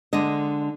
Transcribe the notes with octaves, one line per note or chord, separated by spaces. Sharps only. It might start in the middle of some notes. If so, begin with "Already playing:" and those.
D3 G#3 D4 D#5